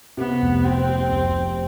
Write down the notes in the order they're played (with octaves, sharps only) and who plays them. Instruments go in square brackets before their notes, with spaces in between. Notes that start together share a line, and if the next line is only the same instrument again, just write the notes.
[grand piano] C3 [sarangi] B3
[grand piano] F1
[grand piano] C3 [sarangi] C4
[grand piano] C3
F1